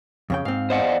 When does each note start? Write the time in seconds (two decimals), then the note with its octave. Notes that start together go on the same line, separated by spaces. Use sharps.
0.30 F2 C#3 G5
0.45 G#2 C4 F5
0.70 E2 C5 D5 D#5 F#5